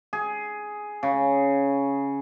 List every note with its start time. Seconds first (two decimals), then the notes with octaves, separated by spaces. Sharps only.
0.13 G#4
1.03 C#3